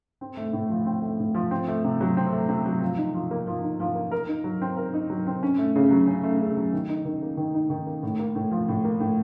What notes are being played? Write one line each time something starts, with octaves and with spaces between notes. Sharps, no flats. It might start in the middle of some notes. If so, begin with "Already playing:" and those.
C4
A3
A2
F3
C4
A3
A2
F3
C4
A3
C3
F#3
C4
A3
C3
F#3
F3
D#4
F3
A#3
F3
D#4
F3
A#3
A#4
D#4
F#3
C4
A#4
D#4
F#3
C4
C#4
A3
C#3
F#3
C#4
A3
C#3
F#3
D#3
D#4
D#3
A#3
D#3
D#4
D#3
A#3
A2
A#3
A2
F3
A2
A#3
A2